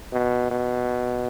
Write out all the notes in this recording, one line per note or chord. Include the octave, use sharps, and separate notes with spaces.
B2
B2